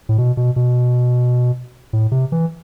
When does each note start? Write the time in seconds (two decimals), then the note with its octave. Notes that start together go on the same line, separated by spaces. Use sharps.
0.09 A2
0.18 B2
0.37 B2
0.56 B2
1.93 A2
2.12 C3
2.32 E3